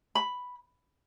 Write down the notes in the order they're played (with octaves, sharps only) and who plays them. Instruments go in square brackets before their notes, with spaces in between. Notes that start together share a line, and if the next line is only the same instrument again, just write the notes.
[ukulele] B5